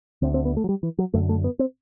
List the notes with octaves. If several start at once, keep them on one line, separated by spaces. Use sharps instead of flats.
D2 D3 C4
C4
B3
A3
F#3
G3
E3
F#3
F#2 D3 A3
A3
B3
C4